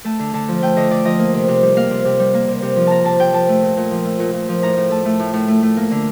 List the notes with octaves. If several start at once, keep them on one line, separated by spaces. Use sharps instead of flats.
A3 A5
D3
D3 A5
F3
A3 G5
D3 D#5
D3 D5
F3 D#5
A#3
C3
C3
G3
A#3 F5
C3
C3
G3
A#3
C3
C3
F3
A#3 A5 A#5
C3 A5
C3 G5
F3 A5
A3
A#2
A#2
F3
A3
A#2
A#2
F3
A2 A#5
A2
A3 A5
A3
A2
A2
A3
A3
A#3
D3